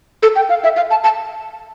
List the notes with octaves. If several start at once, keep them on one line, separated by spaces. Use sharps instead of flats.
A4
G5
F5
E5
F5
A5
A5